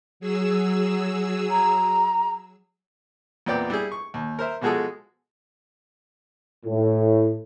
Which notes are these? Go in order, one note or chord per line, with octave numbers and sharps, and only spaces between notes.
F#3 G#4 E6
A#5
E2 A#2 B3 C4 D5 G5
G3 E4 G#4
C#6
D#2
A#4 C5 E5
B2 F3 G#3 F#4 G#4 A4
A2